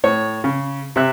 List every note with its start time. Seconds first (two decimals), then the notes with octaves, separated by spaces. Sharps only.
0.04 A2 C#5
0.44 C#3
0.96 C3 E5 F#6